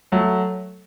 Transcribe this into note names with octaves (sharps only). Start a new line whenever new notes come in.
F#3 A3